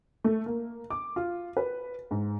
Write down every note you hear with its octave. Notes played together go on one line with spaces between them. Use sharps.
A3
A#3
D6
F4
B4
G#2